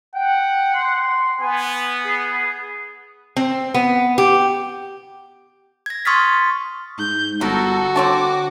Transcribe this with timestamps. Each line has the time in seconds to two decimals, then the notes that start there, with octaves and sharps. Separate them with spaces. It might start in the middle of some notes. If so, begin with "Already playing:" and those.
0.15 F#5 G5
0.75 C6
1.41 B3 G#5
2.06 G#4
3.36 C4
3.74 B3
4.18 G4
5.86 G#6 A#6
6.05 C6 C#6 D#6 F6 A6 B6
6.99 G#2 G6
7.41 G1 B3 F#4 A4 A#4
7.96 D3 C4 C#5 A5 D6